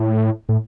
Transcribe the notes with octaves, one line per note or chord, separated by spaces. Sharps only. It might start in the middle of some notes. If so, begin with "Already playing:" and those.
Already playing: A2
A2